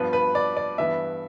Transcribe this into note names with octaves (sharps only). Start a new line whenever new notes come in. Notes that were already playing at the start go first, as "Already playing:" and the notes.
Already playing: G2 F3 B3 B4
B4
D5
D5
G2 E3 B3 E5